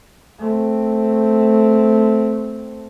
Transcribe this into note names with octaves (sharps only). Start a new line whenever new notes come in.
A3 C4